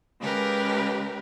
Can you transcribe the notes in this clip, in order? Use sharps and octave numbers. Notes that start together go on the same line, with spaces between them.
C#3 G#3 G4 A#4 B4